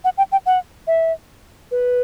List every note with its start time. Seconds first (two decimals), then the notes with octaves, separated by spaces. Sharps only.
0.04 F#5
0.18 G5
0.32 G5
0.46 F#5
0.87 E5
1.71 B4